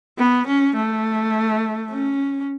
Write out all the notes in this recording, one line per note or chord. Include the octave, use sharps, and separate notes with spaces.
B3
C#4
A3
C#4